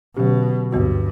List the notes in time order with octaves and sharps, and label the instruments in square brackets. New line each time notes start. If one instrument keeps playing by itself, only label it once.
[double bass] B2 [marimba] D3 F#3 C#4 G4
[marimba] D2 D3 G3 B3 F#4 [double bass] G2